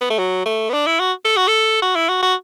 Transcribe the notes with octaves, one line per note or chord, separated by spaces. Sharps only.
B3
A3
F#3
A3
B3
D4
E4
F#4
A4
F#4
A4
F#4
E4
F#4
F#4